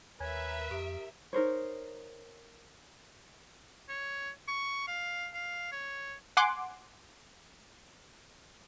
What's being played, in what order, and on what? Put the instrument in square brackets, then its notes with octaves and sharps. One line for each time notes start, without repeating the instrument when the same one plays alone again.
[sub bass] D#2 [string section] A#4 E5 [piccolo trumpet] B4 [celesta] C#5 G#5 G#6
[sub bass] F2 [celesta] G4 D#6 D7
[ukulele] D#4 A#4 C5 C#5
[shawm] C#5
C#6
F5
F5
C#5
[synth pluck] F#5 G#5 C6 D6 F#6